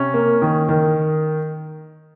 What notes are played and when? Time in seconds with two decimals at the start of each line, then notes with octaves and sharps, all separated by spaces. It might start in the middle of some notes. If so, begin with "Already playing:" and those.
Already playing: C3 C#4
0.14 A#3
0.42 D#3
0.69 D#3